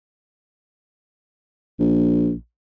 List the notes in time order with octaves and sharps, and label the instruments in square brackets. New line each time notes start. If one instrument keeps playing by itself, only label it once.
[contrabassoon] A#1